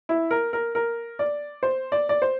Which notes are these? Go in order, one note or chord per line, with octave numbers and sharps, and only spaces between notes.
E4
A#4
A#4
A#4
D5
C5
D5
D5
C5